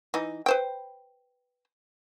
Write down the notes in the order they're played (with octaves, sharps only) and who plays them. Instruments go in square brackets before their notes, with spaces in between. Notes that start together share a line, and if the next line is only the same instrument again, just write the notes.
[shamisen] E3 D#4
B4 C5 G5